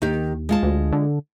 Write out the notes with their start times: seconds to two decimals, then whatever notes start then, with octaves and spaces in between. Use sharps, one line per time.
0.02 D#2 D#3 G4
0.49 G#3 F4 A5
0.63 D2
0.93 D3